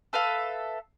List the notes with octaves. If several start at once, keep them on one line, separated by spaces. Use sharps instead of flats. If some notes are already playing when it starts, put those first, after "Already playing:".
A4 B4 E5 F5